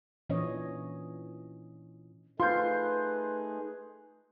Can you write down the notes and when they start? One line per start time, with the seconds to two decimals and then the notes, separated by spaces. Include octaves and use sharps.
0.29 A#2 E3 C#4 D4 C#5 D#5
2.40 A3 D#4 F4 G#4 B4 C6 G6